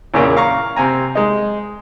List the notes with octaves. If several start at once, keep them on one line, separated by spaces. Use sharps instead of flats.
E2 A#2 C#3 A#3
F5 A#5 C#6
C3 C4 G#5 A#5
G#3 D#4